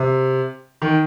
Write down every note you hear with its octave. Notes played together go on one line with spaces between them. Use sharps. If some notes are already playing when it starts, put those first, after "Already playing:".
Already playing: C3
D#3